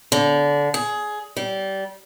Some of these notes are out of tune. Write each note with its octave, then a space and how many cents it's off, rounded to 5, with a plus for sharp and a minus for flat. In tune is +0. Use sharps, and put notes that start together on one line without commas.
D3 -25
G#4 +15
G3 -20